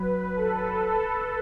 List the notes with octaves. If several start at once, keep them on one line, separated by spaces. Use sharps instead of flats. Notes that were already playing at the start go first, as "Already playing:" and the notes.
Already playing: F#3 B4
A4